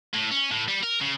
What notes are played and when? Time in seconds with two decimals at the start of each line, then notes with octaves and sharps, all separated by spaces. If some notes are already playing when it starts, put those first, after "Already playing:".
0.14 A2
0.31 C#4
0.51 A2
0.68 G3
0.83 A#4
1.01 C#3